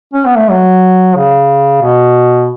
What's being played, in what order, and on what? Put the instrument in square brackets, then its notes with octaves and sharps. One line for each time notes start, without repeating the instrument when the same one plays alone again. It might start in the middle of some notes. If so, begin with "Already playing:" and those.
[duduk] C#4
B3
A3
F#3
C#3
B2